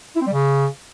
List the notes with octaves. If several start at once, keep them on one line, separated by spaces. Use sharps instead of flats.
E4
C4
G3
C#3